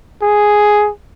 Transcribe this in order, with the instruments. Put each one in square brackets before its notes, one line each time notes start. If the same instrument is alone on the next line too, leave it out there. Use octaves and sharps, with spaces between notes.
[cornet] G#4